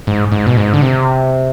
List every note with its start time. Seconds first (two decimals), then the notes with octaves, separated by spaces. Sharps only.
0.07 G#2
0.32 G#2
0.46 B2
0.57 G#2
0.74 D3
0.82 C3